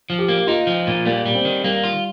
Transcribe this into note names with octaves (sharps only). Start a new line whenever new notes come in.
F3
G4
A#3
D#4 F4
F3
A#2
G3 A#3
G3
C4
D#3
G3 A#3
F4